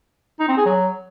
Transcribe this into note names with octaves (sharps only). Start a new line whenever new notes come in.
D#4
C4
G#4
F#3